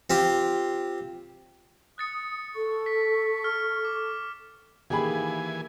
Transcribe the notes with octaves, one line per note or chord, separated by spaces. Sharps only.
C4 F4 G4
D#6 F#6 A6 C#7
A4 C#6
B6
F6
D6
D#3 E3 A#3 G4 G#4 G#5 B5